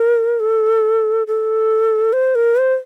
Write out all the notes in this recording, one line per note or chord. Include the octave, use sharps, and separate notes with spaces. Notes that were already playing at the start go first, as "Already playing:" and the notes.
Already playing: A#4
A4
A4
C5
A#4
C5